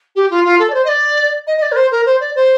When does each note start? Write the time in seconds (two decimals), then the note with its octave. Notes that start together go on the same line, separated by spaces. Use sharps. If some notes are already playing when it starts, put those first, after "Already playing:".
0.15 G4
0.30 F4
0.45 F4
0.59 A4
0.69 D5
0.74 C5
0.84 D#5
0.88 D5
1.47 D#5
1.57 D#5
1.62 D5
1.71 A#4
1.76 C5
1.91 A#4
2.05 C5
2.20 D5
2.35 C5